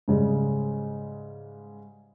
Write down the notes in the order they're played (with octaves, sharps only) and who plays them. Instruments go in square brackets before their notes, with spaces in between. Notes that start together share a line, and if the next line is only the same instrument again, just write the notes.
[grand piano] G#2 C#3 G3